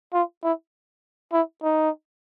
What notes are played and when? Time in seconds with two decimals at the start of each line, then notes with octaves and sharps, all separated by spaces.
0.13 F4
0.43 E4
1.33 E4
1.63 D#4